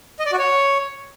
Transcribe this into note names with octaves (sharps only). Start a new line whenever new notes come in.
D#5
D5
F#4
C#5